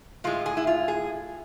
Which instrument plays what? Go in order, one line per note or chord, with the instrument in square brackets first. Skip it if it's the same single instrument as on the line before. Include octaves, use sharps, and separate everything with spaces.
[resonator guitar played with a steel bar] A2 G#3 F4
G#4
E4
F4
G#4